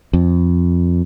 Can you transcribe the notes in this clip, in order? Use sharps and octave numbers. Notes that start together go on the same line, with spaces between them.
F2